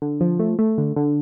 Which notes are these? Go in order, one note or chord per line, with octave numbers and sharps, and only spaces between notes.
D3
F3
A3
A3
D3
D3